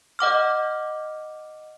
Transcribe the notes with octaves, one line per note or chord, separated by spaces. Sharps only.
D#5 F#5 D6 F6